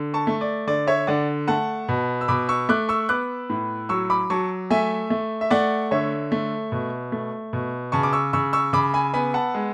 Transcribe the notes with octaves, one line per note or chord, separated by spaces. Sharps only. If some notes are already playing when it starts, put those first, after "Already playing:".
Already playing: D3
A5 C#6
A3
D5
D3 D5
C#5 E5
D3 D5 F#5
A3 F#5 A5
B2
E6
B2 B5 D6
C#6 E6
A3 D6 F#6
C#6 E6
B3 D6 F#6
A2
F#3 C#6 E6
B5 D6
F#3 A5 C#6
A3 E5 G#5
A3
E5
A3 D5 F#5
D3 C#5 E5
A3
B2
A3
B2
C#3 A5 C#6
D6
C#6 E6
C#3 C#6 E6
C#6 E6
C#3 B5 D6
G#5 B5
B3 G#5 B5
F#5 A5
G#3